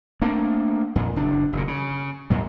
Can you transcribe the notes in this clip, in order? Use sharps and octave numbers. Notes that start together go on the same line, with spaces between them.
A3 A#3 C4 D4
F2 A#2
F#1 D4
F#1 A#2
C#3
G#1 D#2 A#2 F#3